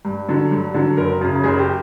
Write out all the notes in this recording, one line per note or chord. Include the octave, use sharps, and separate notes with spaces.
G2
D3 F#3
G2
D3 F#3
F#1 A#4
F#2 C#3
F#1 G#4
G4